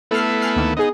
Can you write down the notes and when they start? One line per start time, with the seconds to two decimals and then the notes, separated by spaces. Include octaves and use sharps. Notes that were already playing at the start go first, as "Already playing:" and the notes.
0.11 A3 B3 E4 A4 F6 C7
0.41 G#5 F6 C7
0.56 D2 D#3 A#3
0.77 B3 D#4 G#4